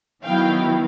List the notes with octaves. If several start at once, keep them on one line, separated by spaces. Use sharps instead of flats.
D#3 F#3 B3 E4 F5 G5